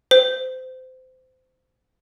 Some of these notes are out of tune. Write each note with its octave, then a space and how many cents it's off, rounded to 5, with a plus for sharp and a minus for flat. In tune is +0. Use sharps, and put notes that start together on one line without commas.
C5 -25